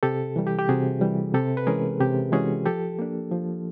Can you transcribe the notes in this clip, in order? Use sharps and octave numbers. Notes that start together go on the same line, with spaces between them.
C3 G4 A4
E3 G3
G4
G4
C3 F#4 G#4
E3 G3
C3 G4 A4
B4
E3 G#3 C#4 G#4 A#4
C3 G4
E3 G#3 C#4 F#4 G#4
F3 G4 A4
A#3 D4
F3